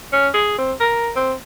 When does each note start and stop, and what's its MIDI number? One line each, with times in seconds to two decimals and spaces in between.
0.13 0.29 61
0.34 0.53 68
0.58 0.72 60
0.80 1.10 70
1.16 1.33 60